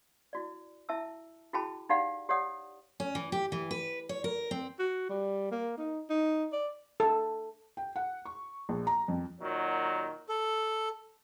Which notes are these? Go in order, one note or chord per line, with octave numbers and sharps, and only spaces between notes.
E4 F#4 D5
E4 E5 A5 E6
E4 F#4 G#4 G5 A5 B5
D#4 G4 D5 F5 F#5 B5
G4 C#5 D5 F#5 D#6
C#4
E3
G4
E3
B4
C#5
A#4
C4
F#4
G3
A#3
D#4
D#4
D5
A4
G5
F#5
C#6
A#1
A#5
F2
A#2 D#3 F#3 F#4
A4